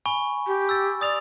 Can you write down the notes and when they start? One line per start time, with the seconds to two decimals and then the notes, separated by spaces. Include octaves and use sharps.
0.06 G#5 B5 C#6
0.47 G4
0.69 E6 A6
1.01 D5 D#6 A6 F7